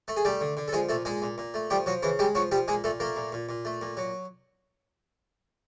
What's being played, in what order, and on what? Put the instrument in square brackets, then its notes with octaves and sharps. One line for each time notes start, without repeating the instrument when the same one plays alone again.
[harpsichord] A3 A4
G#4
G3 A3 G4
D3
D3
A4
F3 G#3 G#4
A#2 A3 A4
A#2 G#3 G#4
A#2
A#2
A3
F3 G3 G4
F3 F#3 F#4
C#3 E3 E4
G3 G#3 G4
F3 F#3 F#4
F3 G3 G4
A#2 G#3 G#4
A#2 A3 A4
A3 A#3 A#4
A#2
A#2
A#2
A3
A#2
F#3